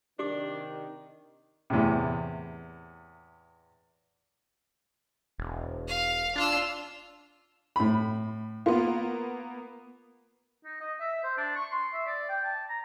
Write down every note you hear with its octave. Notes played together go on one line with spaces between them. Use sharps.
C3 D#3 D4 G4 D6
E2 A2 C3
E1
F5
D4 F4 E6
A2 B5
A#3 B3 F4
D#4
D#5
E5
C5
D4
C#6
C6
E5
D5
G5
A5
A#5